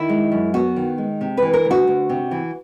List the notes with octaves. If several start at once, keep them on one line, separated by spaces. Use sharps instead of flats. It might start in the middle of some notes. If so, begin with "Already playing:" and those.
Already playing: D#3 E4
G#3
F#2
B3 F#4
D#3
G#3
C3
E3 B4
A#4
D2
F#4
D2
C3
E3